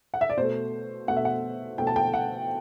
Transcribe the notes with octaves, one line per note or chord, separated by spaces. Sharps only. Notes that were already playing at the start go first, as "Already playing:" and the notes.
F#5
E5
D5
B2 A3 C5
B2 A3 F#5
E5
F#5
B2 A3 G5
A5
G5
F#5